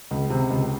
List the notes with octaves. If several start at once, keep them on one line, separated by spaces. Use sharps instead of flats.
C#2
C3
C#2